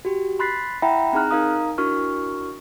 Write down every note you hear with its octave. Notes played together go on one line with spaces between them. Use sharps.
F#4 G4
B5 C6 F#6 A6 B6 C7
E4 E5 F#5 G5 A#5 B5
C4 D#4 G#4 A#5 F6 F#6
D#4 A#4 F5 A#5 D#6
D4 E4 F#4 A#4 C#6 F6